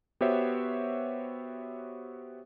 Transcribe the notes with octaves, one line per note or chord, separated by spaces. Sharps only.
B3 F#4 G4 C5 C#5 E5